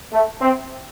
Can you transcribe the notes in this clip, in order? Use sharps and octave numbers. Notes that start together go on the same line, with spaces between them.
A3
C4